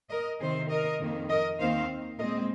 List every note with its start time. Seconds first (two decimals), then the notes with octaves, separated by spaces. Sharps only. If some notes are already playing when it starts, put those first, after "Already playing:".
0.10 A#4 D#5
0.40 C3 D#3 C4 G#4 C5
0.69 A#4 D#5
0.99 F2 D#3 A#3
1.29 A#4 D#5
1.59 D#2 D#3 C4 C5 F5
2.18 A#2 G#3 C4 A#4 D#5